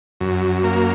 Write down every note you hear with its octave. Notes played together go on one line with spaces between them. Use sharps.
F#2
A#3